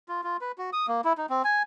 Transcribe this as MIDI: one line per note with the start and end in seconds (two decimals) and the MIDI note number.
0.09 0.21 65
0.23 0.37 65
0.41 0.52 71
0.58 0.70 66
0.73 0.86 87
0.88 1.01 58
1.04 1.13 64
1.18 1.26 63
1.30 1.42 60
1.44 1.63 80